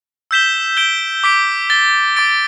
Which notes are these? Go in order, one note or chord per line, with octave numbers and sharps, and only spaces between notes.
E6 G6 B6 E7 G7
G6 D7 G7
D6 B6 D7 G7
A6 G7
D6 A6 D7